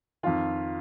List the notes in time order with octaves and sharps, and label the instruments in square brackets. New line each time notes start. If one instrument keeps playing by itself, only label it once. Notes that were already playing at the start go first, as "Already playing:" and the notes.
[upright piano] F2 D#3 F4